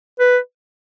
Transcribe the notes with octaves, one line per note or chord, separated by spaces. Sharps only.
B4